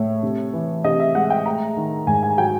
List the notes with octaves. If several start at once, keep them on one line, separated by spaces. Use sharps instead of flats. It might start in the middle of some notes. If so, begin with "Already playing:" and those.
Already playing: A2 A3 C#5
C3
E3
C3 D#5
E5
G#3 F#5
G5
A3 A#5
D#3
G#2 G#5
G#5
F#3 G5